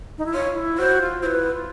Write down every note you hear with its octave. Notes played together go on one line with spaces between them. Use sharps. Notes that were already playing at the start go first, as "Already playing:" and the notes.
D#4
E4
F4 C#5
E4
F#4 C5
F4
E4 B4 C5
F4